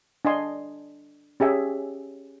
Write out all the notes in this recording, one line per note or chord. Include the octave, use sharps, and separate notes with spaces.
D4 D#5 G#5 C6
C#4 G4 G#4 E5 G#5